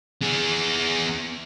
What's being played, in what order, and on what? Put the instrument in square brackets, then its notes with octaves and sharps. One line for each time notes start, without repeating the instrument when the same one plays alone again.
[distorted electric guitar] B3 G#4